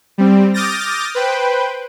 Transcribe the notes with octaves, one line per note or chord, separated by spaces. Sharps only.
G3 C4
D6 D#6 F6 G6 A6 A#6
B4 C5 G5